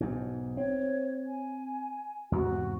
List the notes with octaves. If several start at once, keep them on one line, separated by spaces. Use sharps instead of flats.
B1 G#2
C4 C#5
G#5
E2 G#2 C3 F#4